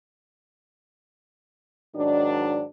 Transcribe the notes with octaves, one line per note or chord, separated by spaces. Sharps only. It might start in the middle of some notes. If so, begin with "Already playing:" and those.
G#2 D#3 F#3 D4